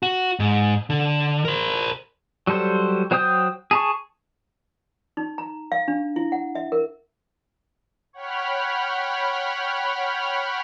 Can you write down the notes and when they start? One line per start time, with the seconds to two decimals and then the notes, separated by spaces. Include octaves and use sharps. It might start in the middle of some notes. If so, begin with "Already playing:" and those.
0.03 F#4
0.39 G#2
0.90 D3
1.45 A#4 C5
2.47 F#3 G3 A4 C5
3.11 F#3 C5 G5 D#6 G6
3.71 G#4 A5 C#6
5.17 D#4
5.38 A#5
5.72 F5
5.88 D4
6.16 E4
6.32 F#5
6.55 E5
6.72 A#4
8.13 C#5 F#5 G5 B5 F6